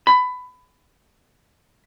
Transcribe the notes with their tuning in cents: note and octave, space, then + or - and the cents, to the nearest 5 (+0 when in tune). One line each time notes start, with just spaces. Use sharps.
B5 +20